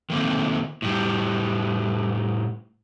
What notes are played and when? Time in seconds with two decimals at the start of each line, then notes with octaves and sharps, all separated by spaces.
0.10 D#3 A3 A#3 C4
0.82 A2 G3